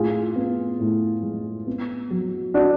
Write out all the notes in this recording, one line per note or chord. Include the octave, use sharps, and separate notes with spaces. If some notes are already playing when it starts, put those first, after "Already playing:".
Already playing: A2 F4 G#4
B3
A2
G#3
B3
F#3
D4 F#4